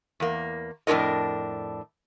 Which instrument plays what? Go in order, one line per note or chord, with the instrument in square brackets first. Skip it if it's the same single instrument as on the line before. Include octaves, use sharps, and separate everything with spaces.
[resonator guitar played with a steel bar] E2 A#3
F2 A2 D4 E4 A#4 D#5